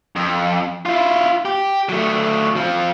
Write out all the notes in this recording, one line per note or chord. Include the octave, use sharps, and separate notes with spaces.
F2
E4 F4
G4
F#3 A3
F3 C4